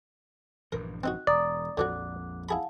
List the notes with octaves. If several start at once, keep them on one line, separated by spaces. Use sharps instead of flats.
A#1 G2 E3 A#4
C4 D#4 F#4 F#6
E1 D5 A#5 D#6
A#1 F2 D3 F3 F#3 F#5 D6 F#6
E4 G#4 F5 F#5 A5 B5